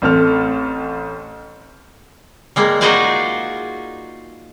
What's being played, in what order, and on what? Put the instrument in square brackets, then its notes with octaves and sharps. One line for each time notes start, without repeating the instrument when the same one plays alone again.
[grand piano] A1 C4 A4 F6
[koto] G3 G#3 A#3
D#4 F4 F#4 G#4 C5 D5